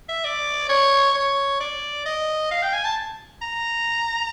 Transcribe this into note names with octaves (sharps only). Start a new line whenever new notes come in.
E5
D5
C#5
C#5
D5
D#5
F5
G5
G#5
A5
A#5